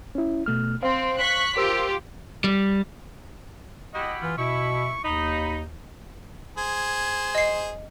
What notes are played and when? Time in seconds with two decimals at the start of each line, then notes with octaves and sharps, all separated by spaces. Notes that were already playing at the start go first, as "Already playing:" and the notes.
0.15 C#4 E4
0.46 B2 A3 F6
0.83 C4 C5 F5
1.18 C#6 F#6 B6
1.57 F4 G4 A#4 C5 E6
2.44 G3
3.94 E4 F#4 G4 D#5
4.22 E3 F4
4.38 B2 E4 C#6
5.04 D#2 D#4 B5
6.57 G#4 C5 G#6
7.35 D#5 C7